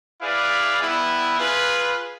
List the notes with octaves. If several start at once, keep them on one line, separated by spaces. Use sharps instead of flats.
E4 G#4 B4 D5 F5
G3 B3 E4
F4 G#4 B4